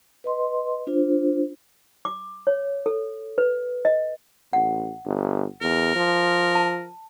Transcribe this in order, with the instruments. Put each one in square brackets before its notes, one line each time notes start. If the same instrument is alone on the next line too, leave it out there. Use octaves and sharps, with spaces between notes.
[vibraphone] B4 D#5 C6
D4 F4 C5
[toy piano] D6
C#5
A4
B4
D#5
[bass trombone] A1 [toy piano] F#5
[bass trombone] G1
[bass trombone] E2 [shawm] A#4
[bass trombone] F3
[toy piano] A5